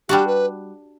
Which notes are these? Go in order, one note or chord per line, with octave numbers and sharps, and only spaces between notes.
G3 D4 F#4 G4
B4